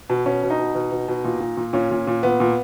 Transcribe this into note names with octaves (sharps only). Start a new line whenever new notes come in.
B2
B2 C#4
B2
D#4
B2
B2
B2
B2
A#2
A#2
A#2
A#2 C#4
A#2
A#2
A#2 B3
A#2